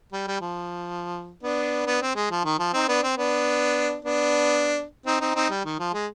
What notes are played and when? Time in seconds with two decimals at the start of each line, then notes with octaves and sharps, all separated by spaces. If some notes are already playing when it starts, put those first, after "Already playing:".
0.12 G3
0.27 G3
0.41 F3
1.43 B3 D4
1.86 B3 D4
2.02 C4
2.16 G#3
2.30 F3
2.44 D#3
2.59 F3
2.74 C4 D#4
2.88 B3 D4
3.03 C4
3.18 B3 D4
4.05 B3 D4
5.06 C4 D#4
5.20 C4 D#4
5.35 C4 D#4
5.50 G3
5.65 D#3
5.79 F3
5.94 G#3